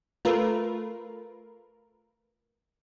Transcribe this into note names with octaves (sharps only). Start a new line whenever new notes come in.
A3 F4 A#4 B4